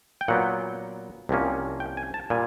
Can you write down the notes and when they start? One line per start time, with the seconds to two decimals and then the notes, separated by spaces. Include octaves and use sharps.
0.21 G5
0.28 A#2 F#3 B3 F#5
1.29 C2 C3 F3 A#3 C#4
1.80 G5
1.97 G#5
2.14 A5
2.30 A#2 G3 G#5